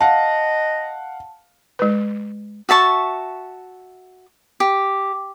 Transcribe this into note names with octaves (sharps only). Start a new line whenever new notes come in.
D#5 F5 F#5 A5
G#3 B4
F#4 E5 A5 C#6
G4